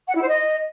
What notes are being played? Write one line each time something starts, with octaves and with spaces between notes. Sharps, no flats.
F#5
E4
C5
D#5